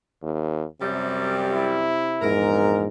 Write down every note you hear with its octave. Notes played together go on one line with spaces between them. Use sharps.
D#2
F#2 C3 G3
E4
A#1 E2 G#2 A#4